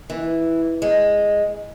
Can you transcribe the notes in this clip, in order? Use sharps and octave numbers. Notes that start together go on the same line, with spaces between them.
E3
G#3